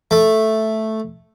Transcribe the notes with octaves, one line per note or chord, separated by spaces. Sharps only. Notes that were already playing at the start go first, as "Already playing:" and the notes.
A3